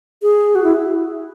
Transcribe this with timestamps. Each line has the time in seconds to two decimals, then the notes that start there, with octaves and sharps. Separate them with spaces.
0.22 G#4
0.55 F#4
0.64 E4